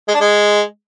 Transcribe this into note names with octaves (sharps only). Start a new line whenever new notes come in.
G#3
D4
G#3